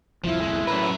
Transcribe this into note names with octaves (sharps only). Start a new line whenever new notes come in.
D1 C2 F2 F3 E4
G#3 A3
F#2 A2 A#4 B4 E5